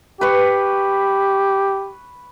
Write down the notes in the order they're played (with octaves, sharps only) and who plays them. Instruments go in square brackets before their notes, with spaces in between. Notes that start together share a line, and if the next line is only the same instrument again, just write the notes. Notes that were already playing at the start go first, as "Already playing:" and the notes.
[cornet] G4 [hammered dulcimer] B4 C#6